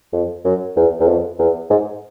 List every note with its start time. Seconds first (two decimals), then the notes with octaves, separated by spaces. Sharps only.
0.13 F2
0.45 F#2
0.76 E2
1.00 E2
1.07 F2
1.39 E2
1.70 G#2